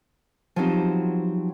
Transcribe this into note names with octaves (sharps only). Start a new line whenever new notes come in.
F3 F#3 B3 C4 D#4 G4